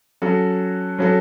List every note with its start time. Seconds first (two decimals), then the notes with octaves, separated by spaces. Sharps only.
0.22 F#3 C#4 F#4 A4
0.98 F#3 C#4 F#4 A4